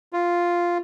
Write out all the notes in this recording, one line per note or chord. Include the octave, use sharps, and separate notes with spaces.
F4